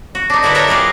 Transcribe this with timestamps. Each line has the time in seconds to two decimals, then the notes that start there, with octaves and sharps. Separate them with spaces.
0.15 F#4
0.30 D4 D#4
0.43 D3 E4 F#4 A#4 B4
0.55 A4 A#4 C#5 E5 F#5 G5
0.68 F4 G4 G#4 A#4